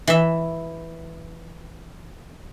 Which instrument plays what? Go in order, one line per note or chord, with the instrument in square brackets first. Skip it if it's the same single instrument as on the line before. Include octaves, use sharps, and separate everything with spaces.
[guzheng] E3 E5